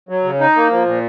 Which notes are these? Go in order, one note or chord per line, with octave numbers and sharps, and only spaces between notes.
F#3
C#3
D#4
A#3
F3
A#2